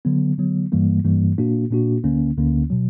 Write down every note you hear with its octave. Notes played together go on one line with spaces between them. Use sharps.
D3 F#3 B3
D3 F#3 B3
G2 E3 G3 A#3
G2 E3 G3 A#3
A#2 A#3 D4 F#4
A#2 A#3 D4 F#4
D2 D3 A#3 C#4
D2 D3 A#3 C#4
B2 F#3